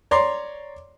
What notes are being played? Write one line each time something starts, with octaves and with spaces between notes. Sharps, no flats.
C#5 D5 A#5 C6